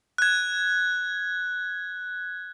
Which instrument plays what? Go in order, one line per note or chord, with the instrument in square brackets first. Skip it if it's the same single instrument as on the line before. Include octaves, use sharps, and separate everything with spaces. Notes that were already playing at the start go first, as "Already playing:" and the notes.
[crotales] F#6 G#6